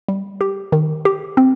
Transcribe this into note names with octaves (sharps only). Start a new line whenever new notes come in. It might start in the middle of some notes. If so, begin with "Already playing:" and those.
G3
G4
D#3
G4
C4